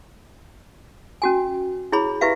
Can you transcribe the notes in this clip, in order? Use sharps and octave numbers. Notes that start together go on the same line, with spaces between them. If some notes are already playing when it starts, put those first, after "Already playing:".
C#4 F#4 G#5
E4 G#4 C#5 B5
E4 G4 B4 E5 F5